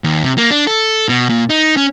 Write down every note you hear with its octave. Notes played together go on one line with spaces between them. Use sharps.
D#2
C3
A#3
D4
A4
B2
A#2
D#4
C#4